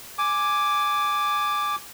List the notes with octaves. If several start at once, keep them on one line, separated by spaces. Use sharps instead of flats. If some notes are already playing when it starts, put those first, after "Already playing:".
G#5 D6